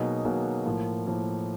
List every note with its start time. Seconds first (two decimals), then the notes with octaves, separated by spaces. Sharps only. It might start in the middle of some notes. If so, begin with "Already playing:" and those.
Already playing: B2 F#3 A#3 D#4 G#4
0.25 B2 F#3 A#3 D#4 G#4
0.65 A2 F3 A#3
1.07 A2 F3 A#3